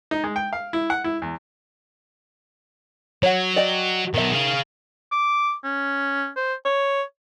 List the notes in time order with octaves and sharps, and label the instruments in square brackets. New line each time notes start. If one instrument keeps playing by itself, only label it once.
[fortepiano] D#4
G#3
G5
F5
E4
F#5
E4
E2
[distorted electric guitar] F#3 [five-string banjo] C#5 F#5
[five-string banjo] D5 D#5 G5
[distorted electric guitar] B2 F#3 [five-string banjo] D#3 E5
[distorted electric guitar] G#4 F5
[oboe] D6
C#4
C5
C#5